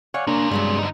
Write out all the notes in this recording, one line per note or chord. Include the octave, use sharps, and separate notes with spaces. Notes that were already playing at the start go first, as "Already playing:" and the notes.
C#5 D5 F5 F#5 G#5
C3 A#3 C#4 D4 A#5
G2 F#3 G#3 B3 D4
D3 D#4